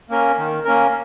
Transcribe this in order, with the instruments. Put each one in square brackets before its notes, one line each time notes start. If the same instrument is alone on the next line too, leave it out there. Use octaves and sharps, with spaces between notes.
[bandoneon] A#3 C#4 A#4
D#3
A#3 C#4 A#4